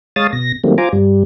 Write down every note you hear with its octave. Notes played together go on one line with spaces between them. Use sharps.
G#3 C#5 F5 A5 D#6 A6
B2 A#6
D#3 F#3 G3 A3 A#3 C4
F4 C5 G#5 A#5 D6
G2 G3